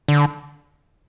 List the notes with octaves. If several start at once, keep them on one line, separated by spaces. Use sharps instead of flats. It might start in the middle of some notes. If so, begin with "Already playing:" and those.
D3